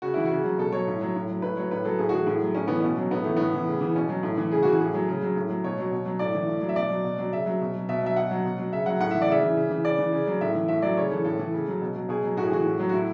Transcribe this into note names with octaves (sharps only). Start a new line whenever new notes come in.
C#3 F#4
E3 E4
F#4
C#3
F#3
B2 A4
F#3 C#5
A2
F#3
A2
F#3
A2 B4
F#3 C#5
A2 B4
F#3 A4
A2 G#4
F#4
E3 G#4
A2
F#3
A2 C#4
E3 B3
B2 C#4
F#3
A2 B3
E3 A3
A2 B3
E3
C#3
E3
B2 C#4
F#3
A2
E3
C#3 G#4
E3 F#4
G#4
A2
F#3
C#3
F#3
A2
F#3
B2 C#5
F#3
B2
F#3
A2 D5
E3
A2
F#3
E5
B2 D5
F#3
B2
F#3
C#3 E5
F#3
B2
F#3
B2 E5
F#3 E5
B2 F#5
F#3
B2
F#3
C#3 E5
F#3 F#5
A2 F#5
E3 E5
D5
C#3 E5
E3
C#3
E3
C#3 D5
E3
C#3
F#3
A2 E5
E3
A2 E5
F#3 D5
C#3 C#5
E3 A4
A2 A4
E3
C#3
F#3
B2
F#3
B2 G#4
F#3
A2 F#4
G#4
E3 F#4
A2
F#3
F#4
A2 E4